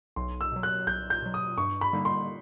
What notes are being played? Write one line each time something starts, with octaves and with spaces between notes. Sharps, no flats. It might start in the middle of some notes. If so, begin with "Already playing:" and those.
B1 C6
E6
B2 F#3
F#6
B1 G6
G6
B2 F#3
D#6
G2 C#6
B5
D3 G3 A#3 D#4
C6